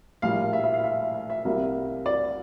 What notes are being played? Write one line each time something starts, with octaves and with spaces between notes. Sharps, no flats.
A#1 A2 G3 A#3 F5
E5
E5
F5
E5
E5
E5
C2 C3 G3 A#3
D5